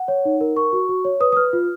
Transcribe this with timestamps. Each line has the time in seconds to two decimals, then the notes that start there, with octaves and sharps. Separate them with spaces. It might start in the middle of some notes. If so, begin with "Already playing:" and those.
Already playing: F#5
0.08 C#5
0.25 D#4
0.41 A#4
0.56 A#4 C#6
0.73 F#4
0.89 F#4
1.05 C#5
1.20 B4 D#6
1.32 D#6
1.37 B4 F6
1.53 F4